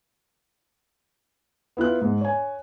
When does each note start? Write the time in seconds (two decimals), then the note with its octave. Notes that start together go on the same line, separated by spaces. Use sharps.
1.77 B3 E4 F4 F#6
2.01 G#2
2.21 C#5 G#5